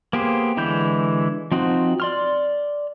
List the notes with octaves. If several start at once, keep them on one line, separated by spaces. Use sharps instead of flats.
A#3 B3 G4 G#4 C5
D3 E3 G#3 E4 G6
F3 C4 D#4 F#4
D5 C6 F6